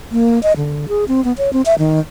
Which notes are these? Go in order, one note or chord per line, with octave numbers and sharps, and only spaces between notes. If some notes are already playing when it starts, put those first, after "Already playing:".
A#3
D#5
D3
G#4
C4
B3
C#5
C4
E5
D#3